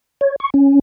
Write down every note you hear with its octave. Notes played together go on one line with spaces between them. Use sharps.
C#5
C#6
C#4